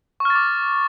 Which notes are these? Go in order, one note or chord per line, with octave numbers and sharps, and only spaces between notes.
C#6 D6 F6 A6